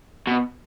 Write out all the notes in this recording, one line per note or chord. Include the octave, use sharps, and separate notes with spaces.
B2